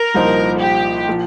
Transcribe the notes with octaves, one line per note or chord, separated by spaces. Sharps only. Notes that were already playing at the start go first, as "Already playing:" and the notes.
Already playing: A#4
C2 A#2 F3 D#4 C5
G4
A#2 F3